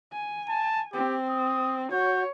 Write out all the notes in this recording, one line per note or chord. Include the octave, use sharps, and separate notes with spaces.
G#5
A5
C4 G4
D#6
F#4 C#5 G6